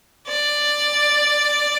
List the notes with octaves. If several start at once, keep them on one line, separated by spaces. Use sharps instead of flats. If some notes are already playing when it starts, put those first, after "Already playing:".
D5